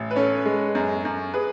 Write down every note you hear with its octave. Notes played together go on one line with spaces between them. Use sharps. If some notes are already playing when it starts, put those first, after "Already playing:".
Already playing: A1
B4
C#4 A4 C#5
G#3
F#2
F#2
G#4 B4